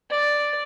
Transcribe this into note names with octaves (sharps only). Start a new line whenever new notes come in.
D5